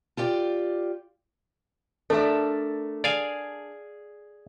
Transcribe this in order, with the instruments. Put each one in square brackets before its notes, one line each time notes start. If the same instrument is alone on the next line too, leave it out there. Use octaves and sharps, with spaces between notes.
[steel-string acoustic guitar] F4 G4 D5 G5
[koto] A3 [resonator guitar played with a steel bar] D4 A#4 E5 [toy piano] A4
[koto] G#4 [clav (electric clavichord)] D5 F5 G#5